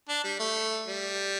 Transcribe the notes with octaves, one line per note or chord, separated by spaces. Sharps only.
D4
G3
A3
G3